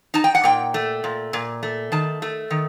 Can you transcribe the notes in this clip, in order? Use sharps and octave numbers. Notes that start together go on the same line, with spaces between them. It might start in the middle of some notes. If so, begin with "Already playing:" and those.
D#4 A5
G5
F#5
A#2 G5
A3
A#2
A#2
A3
D#3 A5
A3
D#3